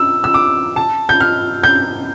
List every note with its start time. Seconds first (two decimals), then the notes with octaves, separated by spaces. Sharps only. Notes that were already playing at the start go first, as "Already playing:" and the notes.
Already playing: E6
0.24 E6
0.34 D6
0.76 A5
1.09 G6
1.20 F6
1.63 G6